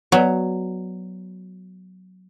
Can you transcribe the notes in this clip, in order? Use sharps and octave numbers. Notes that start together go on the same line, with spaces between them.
F#3 B3 F#4 B4 D5